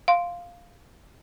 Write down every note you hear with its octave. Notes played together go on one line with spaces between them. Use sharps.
F5 C6